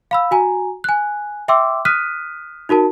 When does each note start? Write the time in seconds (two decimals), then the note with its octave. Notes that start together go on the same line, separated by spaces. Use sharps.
0.11 F5 B5 E6
0.31 F#4 G#5 A#5
0.84 G#5 F#6
1.48 E5 G5 C6 D6 E6
1.85 D#6 F6 F#6 B6 D#7
2.69 D#4 F#4 A#4 A5